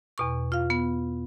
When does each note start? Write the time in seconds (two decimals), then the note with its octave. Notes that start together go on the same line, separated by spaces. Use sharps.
0.18 E2 B2 C#6
0.52 F4 F5
0.70 B3